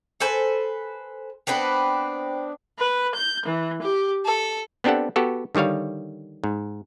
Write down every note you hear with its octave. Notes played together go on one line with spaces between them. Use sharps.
A4 B4 C5 G#5
B3 C4 D4 B4
B4
G6
E3
G4
A4
B3 C4 D4 G4 A4 F#5
B3 F#4 G4 A4
D3 D#3 G3 C#5 F5
G#2